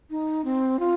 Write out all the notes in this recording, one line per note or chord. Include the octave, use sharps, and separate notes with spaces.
D#4
C4
F4